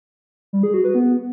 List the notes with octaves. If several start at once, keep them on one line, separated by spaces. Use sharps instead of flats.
G3
G#4
F#4
B4
B3